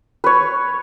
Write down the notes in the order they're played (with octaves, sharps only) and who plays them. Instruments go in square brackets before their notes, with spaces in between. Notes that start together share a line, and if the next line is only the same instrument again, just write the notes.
[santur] B4 C#5